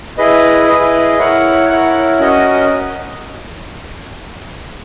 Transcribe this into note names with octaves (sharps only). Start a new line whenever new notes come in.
E4 G#4 B4 D#5
E4 G#4 B4 D#5
E4 A#4 C#5 F#5
E4 A#4 C#5 F#5
C#4 F#4 A#4 D#5